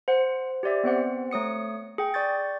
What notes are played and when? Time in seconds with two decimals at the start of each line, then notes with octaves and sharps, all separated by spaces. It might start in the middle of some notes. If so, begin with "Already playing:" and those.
0.08 C5 F#5
0.63 G4 C5 D5 E5
0.84 B3 C4 C5 F#5
1.31 A3 C#5 D#6 C#7
1.98 G#4 G5
2.14 D5 C#6 G6 A6